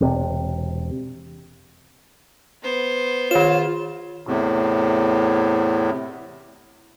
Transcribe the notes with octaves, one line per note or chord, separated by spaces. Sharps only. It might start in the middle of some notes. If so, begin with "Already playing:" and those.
E1 C3
B3 C5
D#3 F4 C#5 E7
E2 A2 C3